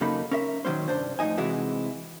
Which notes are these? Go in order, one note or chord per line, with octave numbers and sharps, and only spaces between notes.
F#2 C#3 A#3 D#4 A4 B5
C#4 A#4 E5
A#2 D#3 F#3 C#4 C5
C2 G2 D4 C5
F2 A2 D#3 D#4 D#5 G#5
C3 E3 G#3 E4 F#4